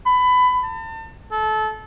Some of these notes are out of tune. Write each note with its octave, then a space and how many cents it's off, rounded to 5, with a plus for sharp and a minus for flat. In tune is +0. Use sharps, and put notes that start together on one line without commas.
B5 +20
A5 +35
A4 -25